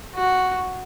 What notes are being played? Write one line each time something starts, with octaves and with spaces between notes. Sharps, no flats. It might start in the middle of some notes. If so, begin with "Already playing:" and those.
F#4